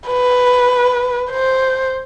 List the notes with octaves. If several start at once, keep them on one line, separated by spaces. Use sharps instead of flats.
B4
C5